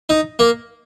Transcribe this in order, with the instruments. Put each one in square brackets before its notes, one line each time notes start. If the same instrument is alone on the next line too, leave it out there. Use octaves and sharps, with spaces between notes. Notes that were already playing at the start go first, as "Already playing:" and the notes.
[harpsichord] D#4
A#3